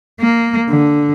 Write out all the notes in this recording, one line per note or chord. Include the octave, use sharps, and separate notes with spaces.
A#3
D3